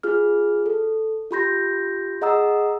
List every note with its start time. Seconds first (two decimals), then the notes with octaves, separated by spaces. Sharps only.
0.03 F4 G#4 F6
0.66 A4
1.31 F4 G4 B5 C6 G6 A#6
2.21 G#4 D#5 F#5 A#5 D#6 E6